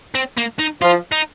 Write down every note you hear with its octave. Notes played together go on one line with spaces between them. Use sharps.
C4
A#3
D#4
F3 F4
D#4